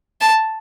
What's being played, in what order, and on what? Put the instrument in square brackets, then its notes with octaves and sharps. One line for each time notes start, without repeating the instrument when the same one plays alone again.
[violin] A5